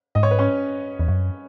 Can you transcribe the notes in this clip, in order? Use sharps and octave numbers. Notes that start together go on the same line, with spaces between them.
G#2 D#5
C#5
B4
C#4 C#5
E2
F#2